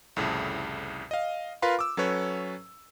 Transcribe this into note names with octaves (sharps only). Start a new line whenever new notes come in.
C2 F2 A2 C#3
D#5 F5
F4 A#4 B4 F5 B5 C6
D6 E6
F#3 C#4 A4 B4 C#5